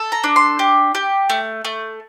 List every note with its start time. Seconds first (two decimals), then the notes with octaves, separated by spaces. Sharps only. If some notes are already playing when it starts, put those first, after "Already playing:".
Already playing: A4
0.12 A#5
0.24 D4
0.36 C6
0.59 G4
0.95 G4
1.30 A3
1.65 A3